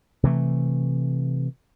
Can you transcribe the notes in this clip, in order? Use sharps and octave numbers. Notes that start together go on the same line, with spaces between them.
C3 E3 A3